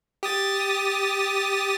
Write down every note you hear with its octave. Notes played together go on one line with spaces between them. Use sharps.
G4 D#6 A6